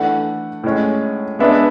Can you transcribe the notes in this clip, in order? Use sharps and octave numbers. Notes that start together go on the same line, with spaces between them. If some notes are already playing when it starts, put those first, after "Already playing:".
Already playing: E3 A3 D4 F#5
A2 G#3 C#4
G#3 B3 D4 E5